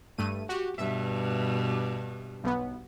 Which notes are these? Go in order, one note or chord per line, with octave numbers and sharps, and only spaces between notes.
G2 A3 D#7
F#4 G4
G2 B2 E5
B1 B3